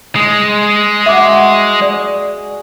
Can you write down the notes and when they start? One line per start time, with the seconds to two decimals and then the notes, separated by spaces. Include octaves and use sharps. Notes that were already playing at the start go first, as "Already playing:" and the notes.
0.16 G#3
1.06 F#4 E5 D6
1.82 G#4 D5